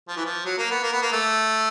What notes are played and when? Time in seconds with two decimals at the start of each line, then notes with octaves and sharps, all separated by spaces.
0.08 F3
0.17 E3
0.25 F3
0.46 F#3
0.58 A#3
0.71 B3
0.83 A#3
0.92 B3
1.02 A#3
1.12 A3